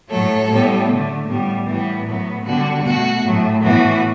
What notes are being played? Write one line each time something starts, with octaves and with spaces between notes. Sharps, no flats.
A2 F#3 A3 A4 C#5
A2 G3 B3
D3 A3
A2 G3 B3
A2 E3 G3 B3
A2 F#3 B3
D3 G3 B3 F#4
B2 A3 F#4
A2 F#3 A3
A2 E3 B3 F#4